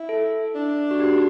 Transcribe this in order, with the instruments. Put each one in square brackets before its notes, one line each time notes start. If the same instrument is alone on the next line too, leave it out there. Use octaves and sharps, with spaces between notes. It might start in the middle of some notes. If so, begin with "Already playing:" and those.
Already playing: [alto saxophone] E4
[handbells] A4
[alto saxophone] D4
[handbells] F#4
G4